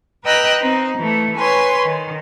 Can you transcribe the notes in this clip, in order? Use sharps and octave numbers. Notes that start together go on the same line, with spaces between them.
B4 D#5 G5 A#5 E6 F#6
C4 D#4
E3 A3
B4 C#5 G#5 C6
D#3